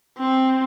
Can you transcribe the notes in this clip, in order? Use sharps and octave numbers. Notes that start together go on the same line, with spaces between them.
C4